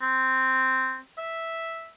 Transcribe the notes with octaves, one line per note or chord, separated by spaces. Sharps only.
C4
E5